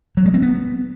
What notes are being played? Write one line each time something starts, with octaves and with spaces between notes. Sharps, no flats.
F#3
G#3
C4
B3